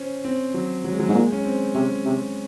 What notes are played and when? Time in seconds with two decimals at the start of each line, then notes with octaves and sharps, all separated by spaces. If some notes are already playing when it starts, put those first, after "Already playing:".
Already playing: C#4 C5
0.25 C4
0.54 F#3
0.84 F#3
0.92 G#3
0.99 F#3
1.09 G#2
1.14 A#2 G#3
1.32 C#4
1.45 C4
1.75 C3 C#4
2.05 C3